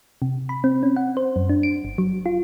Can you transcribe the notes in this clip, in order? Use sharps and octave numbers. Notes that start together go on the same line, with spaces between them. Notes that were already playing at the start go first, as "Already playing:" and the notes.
C3
B5
C4
C#4
F#5
C5
F#2
D4
D7
G1
F#3
F4